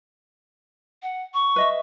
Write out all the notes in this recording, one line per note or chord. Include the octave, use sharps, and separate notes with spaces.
F#5
C#6
B4 D#5 E5